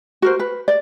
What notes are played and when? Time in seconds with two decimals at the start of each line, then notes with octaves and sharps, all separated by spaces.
0.22 F#4 A#4 C5
0.39 B4
0.68 D5